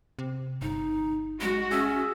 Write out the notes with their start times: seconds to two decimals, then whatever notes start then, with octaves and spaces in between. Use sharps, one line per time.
0.19 C3
0.62 G1 D#4
1.41 G#3 F#4
1.71 C#4 G#4 E5